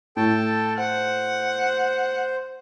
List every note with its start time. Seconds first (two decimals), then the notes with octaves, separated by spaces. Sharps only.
0.17 A2 A4 G5 A5
0.78 C5 F#5